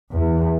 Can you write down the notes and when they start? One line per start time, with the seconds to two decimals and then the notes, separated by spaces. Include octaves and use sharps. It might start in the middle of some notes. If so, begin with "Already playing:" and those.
0.11 E2